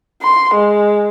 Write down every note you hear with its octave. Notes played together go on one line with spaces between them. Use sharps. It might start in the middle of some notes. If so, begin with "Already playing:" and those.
C6
G#3